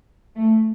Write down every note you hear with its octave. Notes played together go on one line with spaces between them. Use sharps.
A3